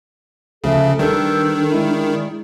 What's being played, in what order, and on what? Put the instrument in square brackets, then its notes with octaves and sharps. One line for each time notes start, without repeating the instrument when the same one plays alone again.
[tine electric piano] D2 F3 [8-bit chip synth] C#3 [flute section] A4 E5 A5
[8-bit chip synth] D#3 [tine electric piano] G3 A4 [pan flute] D4 [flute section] B4 E6 G6
[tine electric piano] G#3 E4 [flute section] G#4 D5